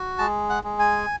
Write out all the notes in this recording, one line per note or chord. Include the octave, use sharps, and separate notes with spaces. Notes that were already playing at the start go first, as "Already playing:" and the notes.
Already playing: F#4
G#3 A5
F#5
G#3
G#5